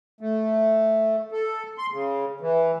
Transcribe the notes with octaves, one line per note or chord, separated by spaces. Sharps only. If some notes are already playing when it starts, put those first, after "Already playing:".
A3
A4
C6
C#3
E3